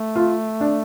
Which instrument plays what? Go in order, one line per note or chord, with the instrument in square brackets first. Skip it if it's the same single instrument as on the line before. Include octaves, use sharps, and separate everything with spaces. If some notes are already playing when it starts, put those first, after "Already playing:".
Already playing: [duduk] A3
[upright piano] F4
D4